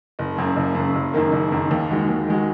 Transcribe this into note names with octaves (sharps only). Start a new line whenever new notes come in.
F#1
F#2 C#3
F#1
F#2 C#3
F#1
F#2 D#3 A#3
F#1
F#2 D#3 A#3
D#2
D#3 G#3 F#4
D#2
D#3 G#3 F#4